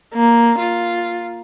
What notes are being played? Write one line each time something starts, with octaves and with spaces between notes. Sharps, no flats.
A#3
F4